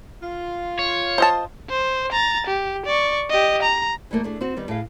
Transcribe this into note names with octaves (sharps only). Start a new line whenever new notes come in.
F4
C#5
C5 D#5 A5
C5
A#5 A6
G4
D5 C#6
G4 D#5
A#5
E3 G3 A3 A#3
A3 D4 G#4
C4 F#4
D#3 G3 B3
A2 A3 G#4 F5